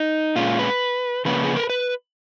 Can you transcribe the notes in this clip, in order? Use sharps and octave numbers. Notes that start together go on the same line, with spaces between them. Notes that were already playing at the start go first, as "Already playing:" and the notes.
Already playing: D#4
A#2 G#3 C#4 F4
B4
C#3 F3 A#3 C#4 B4
G#4
A#4
B4